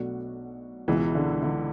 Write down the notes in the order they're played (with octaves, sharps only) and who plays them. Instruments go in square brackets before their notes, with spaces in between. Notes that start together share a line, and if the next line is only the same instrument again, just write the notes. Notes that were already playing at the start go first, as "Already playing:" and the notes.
Already playing: [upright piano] B1 B2 A3 D4 F#4
[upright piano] C#2 B2 G#3 [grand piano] E3
[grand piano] D3
D3